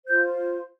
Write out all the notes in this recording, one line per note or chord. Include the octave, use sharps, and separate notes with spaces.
F4 C5 G6